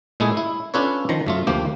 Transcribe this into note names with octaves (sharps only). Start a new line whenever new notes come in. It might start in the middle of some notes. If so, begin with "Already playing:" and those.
A#2 G#3 A3 E4 G#4
E4
C#4 D4 F4 A4 B4 C#5
D#3 F3 A#5
F#2 A3 F4
D2 F3 A#3 G4